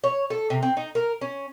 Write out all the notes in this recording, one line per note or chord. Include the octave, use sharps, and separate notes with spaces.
C#5
A4
C3
C4
D#4
A#4
C#4